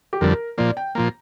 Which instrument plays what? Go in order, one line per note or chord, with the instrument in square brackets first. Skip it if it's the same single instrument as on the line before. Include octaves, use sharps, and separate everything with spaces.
[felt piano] G4
[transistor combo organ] F2 D3 G3 [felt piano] A#4
[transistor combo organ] A#2 F3 A#3 [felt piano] D5
[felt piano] G5
[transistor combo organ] A#2 F3 A#3 [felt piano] A#5